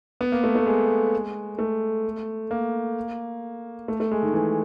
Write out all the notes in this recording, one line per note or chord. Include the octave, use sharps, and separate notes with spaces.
B3
A#3
A3
A3
G#3
A3
A#3
A3
A3
G#3
D#3
E3